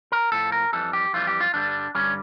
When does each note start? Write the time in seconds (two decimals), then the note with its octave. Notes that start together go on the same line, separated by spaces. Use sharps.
0.12 A#4
0.32 A2 F3 A4
0.52 A#4
0.73 F2 E3 G3 A4
0.93 G4
1.13 F2 E3 G3 F4
1.27 G4
1.40 F4
1.54 G2 D3 G3 D4
1.95 G2 D3 G3 C#4